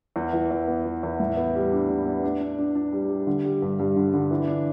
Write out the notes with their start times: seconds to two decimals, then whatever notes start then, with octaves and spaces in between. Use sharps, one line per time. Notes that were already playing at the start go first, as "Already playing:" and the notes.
0.16 E2
0.33 E3
0.51 E2
0.68 B3
0.85 E3
1.03 E2
1.20 A2
1.37 B3
1.55 G3
1.72 D4
1.89 A2
2.06 B3
2.24 D4
2.41 D4
2.59 D4
2.75 D4
2.93 G3
3.10 G3
3.27 D3
3.45 G3
3.62 G2
3.79 G2
3.96 D3
4.13 D3
4.31 E3
4.47 D4